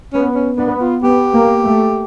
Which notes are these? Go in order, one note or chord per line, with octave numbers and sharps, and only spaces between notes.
B3 C#4
C#4
B3 D4
F4
B3 G4
A#3
A3